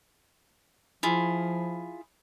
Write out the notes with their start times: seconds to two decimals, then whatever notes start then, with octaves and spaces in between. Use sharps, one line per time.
1.03 F3 E4 F4 G#4